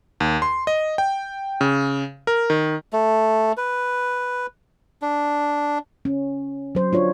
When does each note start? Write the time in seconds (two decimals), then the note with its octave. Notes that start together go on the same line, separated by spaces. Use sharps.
0.20 D#2
0.42 C6
0.67 D#5
0.98 G5
1.61 C#3
2.27 A#4
2.50 D#3
2.93 A3
3.57 B4
5.02 D4
6.05 C#4
6.75 F#3 C5
6.93 D4 F4 C#5